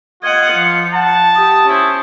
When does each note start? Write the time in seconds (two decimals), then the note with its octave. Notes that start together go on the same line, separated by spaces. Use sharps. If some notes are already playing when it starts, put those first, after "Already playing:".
0.23 F4 D#5 F#5 G#6
0.54 F3 C#7
0.95 F#5 A5
1.35 G4 D#6
1.68 C#4 E4 C5